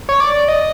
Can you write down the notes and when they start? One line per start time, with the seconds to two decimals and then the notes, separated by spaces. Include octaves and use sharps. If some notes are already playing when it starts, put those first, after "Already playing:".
0.09 C#5
0.20 D5
0.48 D#5